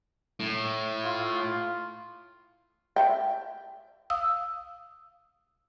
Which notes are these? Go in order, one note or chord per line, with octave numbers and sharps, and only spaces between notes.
A2
F4
E5 G5
F5 D#6 E6